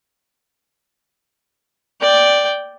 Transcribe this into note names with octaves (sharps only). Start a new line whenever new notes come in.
D5 G5